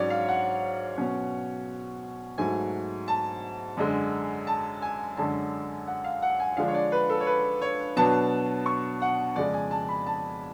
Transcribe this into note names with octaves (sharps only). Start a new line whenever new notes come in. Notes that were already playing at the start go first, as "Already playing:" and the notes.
Already playing: G#2 F#3 C#4 C#5 D5
F5
F#5
B2 F#3 C#4
G#2 F#3 A3 G#5
A5
F#2 D3 G#3
A5
G#5
F#2 D3 G#3 C#4 A5
F#5
F5
F#5
G#5
D3 F3 G#3 D4 F5
C#5
D5
B4
A4
C#5
B4
C#5
B2 F#3 B3 D4 A5
C#6
F#5
F2 C#3 G#3 D5
G#5
A5
B5
A5